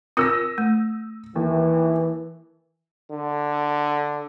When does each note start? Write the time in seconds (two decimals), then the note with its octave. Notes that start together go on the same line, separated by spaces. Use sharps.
0.17 C4 F4 A#4 D#6 E6 A#6
0.58 A3
1.35 D#2 E3
3.11 D3